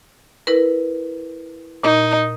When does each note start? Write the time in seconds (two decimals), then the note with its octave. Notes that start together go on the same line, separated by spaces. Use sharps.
0.47 E4 A#4 B4
1.83 A#2 D#4